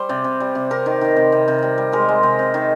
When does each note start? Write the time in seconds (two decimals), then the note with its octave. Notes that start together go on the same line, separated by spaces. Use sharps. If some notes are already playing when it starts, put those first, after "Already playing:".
Already playing: G3 C5
0.09 C3 D5
0.24 C3
0.40 G3
0.55 C3
0.71 C3 A#4
0.86 D#3
1.01 D#3
1.16 C3
1.32 C3
1.48 C3
1.63 G3
1.78 G3
1.92 G#3 A#4
2.09 G#3
2.23 C3
2.39 C3
2.54 D#3